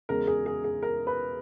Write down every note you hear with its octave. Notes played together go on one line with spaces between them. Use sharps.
E2 C#3 G#3 A#4
G#4
G#4
G#4
A#4
B4